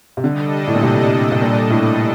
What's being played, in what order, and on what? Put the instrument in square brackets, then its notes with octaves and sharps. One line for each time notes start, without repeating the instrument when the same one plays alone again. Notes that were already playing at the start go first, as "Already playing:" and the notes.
[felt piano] C3
[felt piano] D3 [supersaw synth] G3 D4 A4 D#5
[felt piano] A2
A#2
C3
C3
A#2
A2